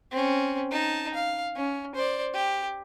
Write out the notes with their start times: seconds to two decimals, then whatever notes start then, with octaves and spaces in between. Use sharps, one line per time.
0.12 C4 C#4
0.71 D#4 A5
1.14 F5
1.56 C#4
1.95 C5 D5
2.34 G4